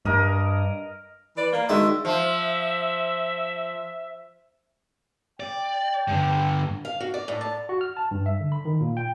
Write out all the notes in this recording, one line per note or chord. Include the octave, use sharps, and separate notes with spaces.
G2 A#4 D#5
E3 B4 D5
A#3
D#3 G#3 D4 F#4 E5
F3 E5
D5 G5
G2 D3
F5
F#4
D5
A2
A5
F#4
F6
A5
G2
E5
D3
B5
D#3
A#2
G5